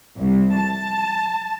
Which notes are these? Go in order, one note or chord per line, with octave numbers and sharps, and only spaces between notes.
C2
A5